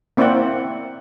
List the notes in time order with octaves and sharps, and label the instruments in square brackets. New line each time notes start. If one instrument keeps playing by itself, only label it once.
[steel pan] A#3 C4 E4 D5 E5 F#5